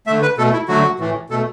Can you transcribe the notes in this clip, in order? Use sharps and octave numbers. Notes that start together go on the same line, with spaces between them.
D3 A3 E5
B4
B2 A3 A4
E4
D3 F#3 A3 F#4
A2 E3 A3
B2 A3 A4